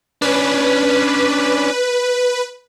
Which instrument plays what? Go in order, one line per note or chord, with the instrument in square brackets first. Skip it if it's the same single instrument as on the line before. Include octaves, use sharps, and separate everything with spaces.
[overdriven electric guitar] C#4 D4 [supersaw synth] B4